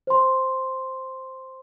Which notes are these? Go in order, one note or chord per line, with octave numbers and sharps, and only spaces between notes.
C5 C6